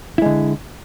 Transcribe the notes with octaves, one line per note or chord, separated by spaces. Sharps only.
D3 G#3 E4